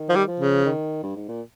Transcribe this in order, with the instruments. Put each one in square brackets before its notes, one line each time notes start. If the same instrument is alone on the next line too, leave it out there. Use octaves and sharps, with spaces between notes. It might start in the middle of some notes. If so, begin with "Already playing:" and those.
Already playing: [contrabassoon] D#3
[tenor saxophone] F3
G3
[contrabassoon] F3
[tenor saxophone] C#3
[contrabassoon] D#3
G2
G#2
A#2